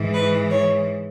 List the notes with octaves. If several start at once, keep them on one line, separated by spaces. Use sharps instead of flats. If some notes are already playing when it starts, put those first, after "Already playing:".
Already playing: G#2 E3
B4
C#5